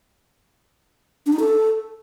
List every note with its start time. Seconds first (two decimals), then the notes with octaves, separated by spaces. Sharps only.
1.26 D4
1.33 D#4
1.39 A4